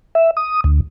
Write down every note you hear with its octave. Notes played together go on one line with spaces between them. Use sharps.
E5
D#6
D2